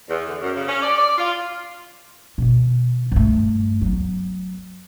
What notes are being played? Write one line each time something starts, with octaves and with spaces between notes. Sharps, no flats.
E2
D3
F#2
C#3
C#4
D5
D5
F4
B2 D#3
G2 A3
F#3 B3